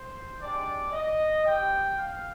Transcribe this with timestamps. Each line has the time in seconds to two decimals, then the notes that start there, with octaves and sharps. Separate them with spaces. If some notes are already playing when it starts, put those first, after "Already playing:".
Already playing: C5
0.41 G#3 D4 G4 D5
0.93 D#5
1.44 C4 G4 G5
1.96 F5